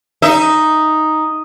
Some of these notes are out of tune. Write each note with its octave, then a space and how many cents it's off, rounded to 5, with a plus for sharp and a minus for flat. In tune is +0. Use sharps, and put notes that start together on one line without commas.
D#4 +0 E5 +5